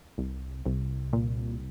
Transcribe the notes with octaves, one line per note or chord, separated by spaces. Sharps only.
C2
C2
A#2